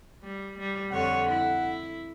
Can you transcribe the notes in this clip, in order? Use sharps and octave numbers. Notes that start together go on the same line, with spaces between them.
G3
G3
F2 D3 C#5 F#5
E4